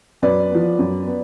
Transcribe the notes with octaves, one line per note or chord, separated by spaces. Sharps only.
F#2 B4 D5
F3 B3
F#2
B3